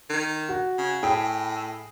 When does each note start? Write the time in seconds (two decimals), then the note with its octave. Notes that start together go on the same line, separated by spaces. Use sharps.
0.10 D#3
0.49 F#4
0.78 C#3
1.03 A2 G#4 G5 B5